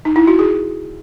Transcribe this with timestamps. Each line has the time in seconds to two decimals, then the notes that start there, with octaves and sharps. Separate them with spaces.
0.05 D#4
0.16 E4
0.27 F#4
0.39 G#4